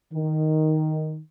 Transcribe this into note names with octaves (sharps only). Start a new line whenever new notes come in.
D#3